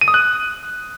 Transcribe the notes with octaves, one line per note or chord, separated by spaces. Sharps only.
D#7
D#6
F#6